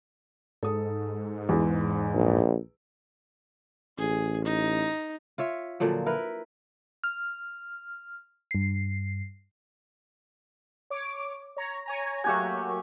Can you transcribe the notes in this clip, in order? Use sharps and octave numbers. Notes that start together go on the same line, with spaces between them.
G#2 A4 D#6
E2 G#3
A#1
A1 G#4
D#4
F4 C#5 E5
A#2 D3 F3 F#3
E4 A#4 B4
F6
G2 C7
C#5 D6
C#5 A#5
C#5 G#5 A#5
F#3 A3 A#3 F#4 G4 G#5